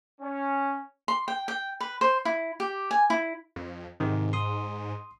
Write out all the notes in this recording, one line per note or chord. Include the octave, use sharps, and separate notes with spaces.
C#4
C6
G5
G5
B4
C5
E4
G4
G#5
E4
F2
G#2 C3 D#3
C6 D#6